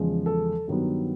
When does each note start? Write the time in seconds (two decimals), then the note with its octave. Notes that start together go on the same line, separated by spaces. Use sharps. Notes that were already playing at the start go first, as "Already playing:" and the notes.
Already playing: E2 C#3 F3 G#3
0.26 A4
0.68 G2 D#3 F#3 B3